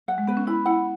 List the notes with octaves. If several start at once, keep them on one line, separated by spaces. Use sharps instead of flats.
F#3 F#5
G#3
B3 B4
C#4
E4 B5
E4 F#5